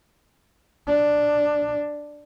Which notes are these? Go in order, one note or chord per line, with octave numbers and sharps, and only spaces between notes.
D4